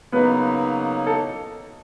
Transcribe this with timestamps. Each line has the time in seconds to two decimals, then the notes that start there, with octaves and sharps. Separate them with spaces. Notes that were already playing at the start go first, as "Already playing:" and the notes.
0.12 C#3 F#3 A#3 B3 D#4 B4
1.07 A4